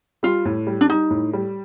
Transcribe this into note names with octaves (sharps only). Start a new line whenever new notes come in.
G3 F4
A2
G3
D4
G3 D#4
A2
G3